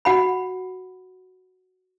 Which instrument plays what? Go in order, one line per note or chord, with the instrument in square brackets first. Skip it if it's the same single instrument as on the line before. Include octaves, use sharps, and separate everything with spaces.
[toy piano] F#4 F#5 B5